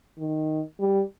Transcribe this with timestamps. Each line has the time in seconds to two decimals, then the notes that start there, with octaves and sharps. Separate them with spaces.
0.18 D#3
0.80 G3